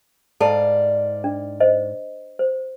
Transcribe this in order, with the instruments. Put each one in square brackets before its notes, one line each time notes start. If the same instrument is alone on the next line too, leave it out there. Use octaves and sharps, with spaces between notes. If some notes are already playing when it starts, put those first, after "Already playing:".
[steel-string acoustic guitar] G#2 D5 F5 [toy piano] A4 A5
[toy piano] D4
C5 D#5
C5